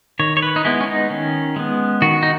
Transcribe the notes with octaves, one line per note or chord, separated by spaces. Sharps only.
D#3 C#5
C#5
B4
D#4
G#3 B3 E4
C#4
D#4
D#3 C#4
G#3 B3
D#3 F#4
D#4